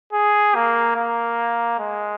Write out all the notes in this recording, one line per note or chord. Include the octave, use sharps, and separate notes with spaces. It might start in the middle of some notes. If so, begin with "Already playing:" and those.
G#4
A#3
A#3
G#3